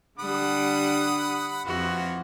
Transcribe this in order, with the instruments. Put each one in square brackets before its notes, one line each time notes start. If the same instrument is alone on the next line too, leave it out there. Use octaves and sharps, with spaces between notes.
[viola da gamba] D3 G3 D4 [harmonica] F#5 B5 D#6
[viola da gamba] F2 F#4 [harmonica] E3 F4